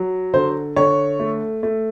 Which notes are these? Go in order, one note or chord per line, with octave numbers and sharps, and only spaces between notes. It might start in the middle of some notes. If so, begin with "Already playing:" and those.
Already playing: F#3
D3 C5
D3 C#5
A3
A3